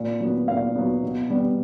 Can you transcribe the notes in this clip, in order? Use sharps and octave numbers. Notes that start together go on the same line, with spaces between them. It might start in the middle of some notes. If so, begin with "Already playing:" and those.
Already playing: A#2
F#3 B3
A#2 F5
F#3 B3
B2
G3 B3